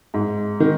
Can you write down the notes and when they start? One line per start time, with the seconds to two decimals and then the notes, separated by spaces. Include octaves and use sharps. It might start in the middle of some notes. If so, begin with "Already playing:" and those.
0.14 G#2
0.60 D#3